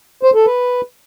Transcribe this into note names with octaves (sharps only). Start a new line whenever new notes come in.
C5
A4
B4